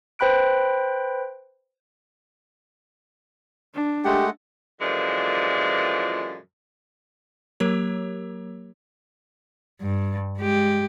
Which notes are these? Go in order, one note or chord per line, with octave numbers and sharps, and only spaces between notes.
B4 C5 G5 B5 F#6 D7
D4
G#3 A3 G4 F#5
F#2 A#2 D3 E3 F3 G#3
F#3 A#3 G4 A#4 C#5
G2
G#3 G4